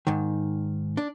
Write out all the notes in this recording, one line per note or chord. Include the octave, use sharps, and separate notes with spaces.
G#2 D#3
D4